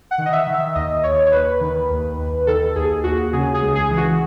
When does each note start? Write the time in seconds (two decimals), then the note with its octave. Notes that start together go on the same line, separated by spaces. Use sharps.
0.11 F#5
0.18 D#3
0.26 D#5
0.32 E5
0.47 D#3
0.54 E5
0.75 D#2 D#5
1.03 D#2 C#5
1.26 C#5
1.32 D#2 B4
1.60 D#3
1.90 D#2
2.18 D#2
2.47 D#3 A4
2.76 D#2 G#4
3.04 D#2 F#4
3.33 C#3 G#4
3.54 G#4
3.61 C#2
3.75 G#4
3.90 E3
3.97 F#4